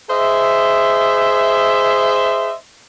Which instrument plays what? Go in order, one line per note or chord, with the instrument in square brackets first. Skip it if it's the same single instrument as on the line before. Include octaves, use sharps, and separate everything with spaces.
[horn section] G#4 C5 D#5 E5